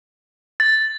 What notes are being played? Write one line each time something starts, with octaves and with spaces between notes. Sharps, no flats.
A6